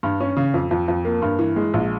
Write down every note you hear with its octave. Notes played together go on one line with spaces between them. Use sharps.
G2
C#4
C#3
F2
F2
F2
A#3
G2
E3
G#3
A#1